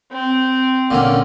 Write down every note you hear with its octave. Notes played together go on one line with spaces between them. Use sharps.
C4
A#2 D3 C#4